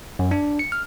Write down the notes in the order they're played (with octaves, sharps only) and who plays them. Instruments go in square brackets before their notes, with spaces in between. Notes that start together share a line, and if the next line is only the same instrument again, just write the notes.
[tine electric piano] F#2
D4
C#7
F6